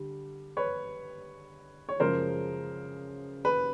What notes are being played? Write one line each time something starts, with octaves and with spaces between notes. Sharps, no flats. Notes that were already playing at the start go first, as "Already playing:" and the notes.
Already playing: D3 G3
B4 C#5
C#5
F#2 C#3 F3 G#3 A#4 C5
B4